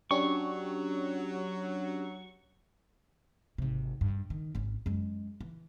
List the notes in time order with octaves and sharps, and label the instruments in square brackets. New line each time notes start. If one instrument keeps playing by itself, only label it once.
[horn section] F#3 [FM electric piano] C#4 D4 G4 [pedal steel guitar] C#6
[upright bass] G#1 C3
G2
D#3
G#1 C#4
F#2 G#3
E3